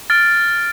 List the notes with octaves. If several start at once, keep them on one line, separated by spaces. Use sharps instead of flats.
F6 A6 D7